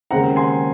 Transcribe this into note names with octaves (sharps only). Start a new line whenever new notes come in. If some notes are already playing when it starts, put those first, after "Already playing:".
D#2 C#3 G#3 C4 F#5 A#5
G#5 C6